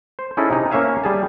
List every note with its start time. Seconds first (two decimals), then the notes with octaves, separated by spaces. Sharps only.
0.19 C5
0.37 C#4 D#4 E4 G#4 A4
0.51 C3 D#4
0.71 A#3 C#4 C#5 E5 F5 G#5
1.04 G3 G#4 A5